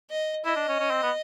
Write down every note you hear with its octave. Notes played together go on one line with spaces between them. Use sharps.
D#5
E4 D#5
D4
C#4
C#4
C4
B3